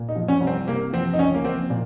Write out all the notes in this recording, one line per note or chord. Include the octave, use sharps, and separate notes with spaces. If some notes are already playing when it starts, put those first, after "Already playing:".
Already playing: A#2
D#4
F3
C#4
C2
C4
C3 A#3
F3 C4
D#4
C#2 C#4
A#3
F3 C4
A#2